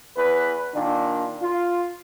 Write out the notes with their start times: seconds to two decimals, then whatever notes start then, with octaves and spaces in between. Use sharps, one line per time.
0.17 E2 B4
0.75 A#2 D#3 D4
1.42 F4